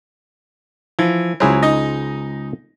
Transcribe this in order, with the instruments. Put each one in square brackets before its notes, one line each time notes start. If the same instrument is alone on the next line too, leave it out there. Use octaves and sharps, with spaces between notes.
[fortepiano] E3 [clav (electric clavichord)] F3
[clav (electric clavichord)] C#2 G#4 C5 [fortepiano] F#3 E4
[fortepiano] D#4 D#5